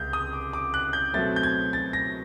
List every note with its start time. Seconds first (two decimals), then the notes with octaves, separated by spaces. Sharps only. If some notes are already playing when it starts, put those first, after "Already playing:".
Already playing: C#2 C3 G6
0.13 D#6
0.33 D6
0.53 D6
0.74 F#6
0.93 G6
1.14 B2 F#3 A3 C4 A6
1.36 G6
1.43 G#6
1.73 A6
1.93 A#6